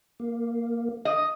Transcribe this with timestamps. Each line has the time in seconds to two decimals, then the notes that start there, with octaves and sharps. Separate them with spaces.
0.20 A#3
1.05 D#5